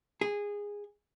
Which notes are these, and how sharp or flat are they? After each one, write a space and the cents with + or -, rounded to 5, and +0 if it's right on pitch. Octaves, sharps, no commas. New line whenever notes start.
G#4 -15